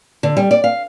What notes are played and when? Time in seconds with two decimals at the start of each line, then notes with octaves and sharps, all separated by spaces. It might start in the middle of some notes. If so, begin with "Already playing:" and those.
0.23 D3
0.37 G3
0.51 D5
0.64 F5